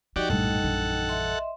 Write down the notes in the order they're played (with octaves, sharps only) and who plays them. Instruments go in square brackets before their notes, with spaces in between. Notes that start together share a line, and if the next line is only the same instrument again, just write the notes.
[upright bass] F3 [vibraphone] D#4 D#5 G5 [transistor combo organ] F#4 G4 D5
[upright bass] A#1 A2 [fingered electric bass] F#2 G3 [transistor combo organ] A4 F#5
[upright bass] A#1 E3
[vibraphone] D#5 E5 C6